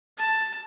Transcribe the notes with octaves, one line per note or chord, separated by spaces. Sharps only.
A5